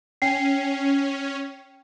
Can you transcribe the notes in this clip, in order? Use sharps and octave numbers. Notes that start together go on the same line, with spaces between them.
C#4 G5 C7